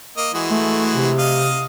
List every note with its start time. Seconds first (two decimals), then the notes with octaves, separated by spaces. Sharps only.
0.17 A#3 D#5
0.34 E3 G#3 F#4
0.50 A3
0.94 C3
1.18 D#5 F5 D#6